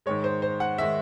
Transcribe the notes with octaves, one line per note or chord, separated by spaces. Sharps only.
G#2 D#3 G#3 C#5
C5
C5
F#5
D#3 G#3 E5